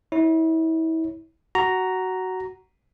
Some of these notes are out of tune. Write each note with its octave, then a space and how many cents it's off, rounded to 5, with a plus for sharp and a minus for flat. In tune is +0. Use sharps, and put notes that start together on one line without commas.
E4 -35 C#5 +0
F#4 +10 A#5 +0